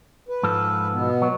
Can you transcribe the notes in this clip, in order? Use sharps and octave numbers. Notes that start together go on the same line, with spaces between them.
B4
G#2 F3 A4
B2 B3
F#3